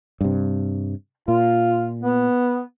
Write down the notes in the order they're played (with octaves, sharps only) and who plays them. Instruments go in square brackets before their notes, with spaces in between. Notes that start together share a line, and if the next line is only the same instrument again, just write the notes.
[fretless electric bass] G2 C3
[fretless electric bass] A#2 [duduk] F4
[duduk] B3